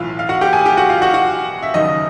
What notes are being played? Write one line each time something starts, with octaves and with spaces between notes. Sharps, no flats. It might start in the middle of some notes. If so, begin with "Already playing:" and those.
Already playing: B1 A2 E3 F4 F5
F5
F#4 F#5
G4 G5
G#4 G#5
G4 G5
F#4 F#5
F4 F5
F#4 F#5
F#4 F#5
E5
F#1 F#2 D#3 F#3 D#4 D#5